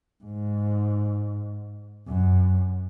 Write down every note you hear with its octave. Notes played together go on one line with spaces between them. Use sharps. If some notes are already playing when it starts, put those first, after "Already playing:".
G#2
F#2